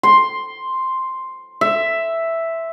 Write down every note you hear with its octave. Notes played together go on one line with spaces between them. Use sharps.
C6
E5